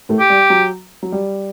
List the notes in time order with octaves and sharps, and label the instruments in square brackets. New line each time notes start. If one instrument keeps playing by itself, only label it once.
[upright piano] A2 A3
[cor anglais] G4
[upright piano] G3
F#3
F#3
G3